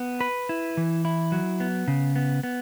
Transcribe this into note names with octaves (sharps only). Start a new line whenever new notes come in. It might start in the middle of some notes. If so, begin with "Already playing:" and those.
Already playing: B3
B4
E4
E3
E4
F#3
B3
C#3
B3
B3